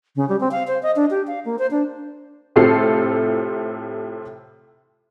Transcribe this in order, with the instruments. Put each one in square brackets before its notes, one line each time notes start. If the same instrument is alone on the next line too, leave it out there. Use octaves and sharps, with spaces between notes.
[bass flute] C#3
G3
C4
F5
C5
D#5
D4
G4
F5
A#3
C5
D4
[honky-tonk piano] A2 C3 F4 A4 C5 C7